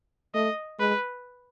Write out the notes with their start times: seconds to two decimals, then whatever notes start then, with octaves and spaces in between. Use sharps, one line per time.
0.34 A3 D#5
0.79 G#3 B4